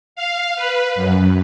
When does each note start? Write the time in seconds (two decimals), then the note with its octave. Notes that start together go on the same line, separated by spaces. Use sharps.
0.16 F5
0.56 B4
0.95 F#2